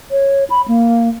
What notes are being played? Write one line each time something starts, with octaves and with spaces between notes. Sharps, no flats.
C#5
B5
A#3